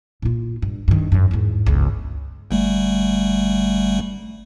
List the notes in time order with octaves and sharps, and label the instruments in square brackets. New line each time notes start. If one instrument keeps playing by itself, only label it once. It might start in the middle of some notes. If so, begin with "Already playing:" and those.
[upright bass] A#2 F4
G2
G2 D#3
F#2 F#3
E2 G#2
G1 C#2
[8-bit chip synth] G1 G3 A3